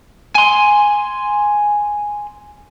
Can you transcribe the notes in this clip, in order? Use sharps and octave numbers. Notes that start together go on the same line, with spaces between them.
G#5 C6